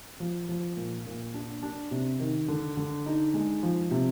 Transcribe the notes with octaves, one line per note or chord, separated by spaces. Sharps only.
F3
F3
A#2
A#2
D4
D4
C3
D#3
D3
D3
D#4
G#3
F3
C3